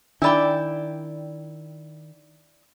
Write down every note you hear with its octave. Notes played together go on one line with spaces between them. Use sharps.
D#3 D4 E4 D5 G5 B5